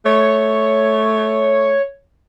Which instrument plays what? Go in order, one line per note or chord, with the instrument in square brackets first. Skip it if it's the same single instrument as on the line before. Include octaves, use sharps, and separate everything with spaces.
[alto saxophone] A3 [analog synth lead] C#5